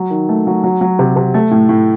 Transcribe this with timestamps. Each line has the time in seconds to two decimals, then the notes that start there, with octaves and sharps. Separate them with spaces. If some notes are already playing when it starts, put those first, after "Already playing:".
Already playing: F#3
0.10 D#3
0.29 A3
0.47 F#3
0.64 F#3
0.81 F#3
0.99 C3
1.16 C3
1.34 A3
1.51 A2
1.69 A2